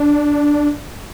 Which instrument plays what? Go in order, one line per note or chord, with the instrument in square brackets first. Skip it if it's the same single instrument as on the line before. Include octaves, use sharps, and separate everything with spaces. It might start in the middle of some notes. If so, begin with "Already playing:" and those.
Already playing: [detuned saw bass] D4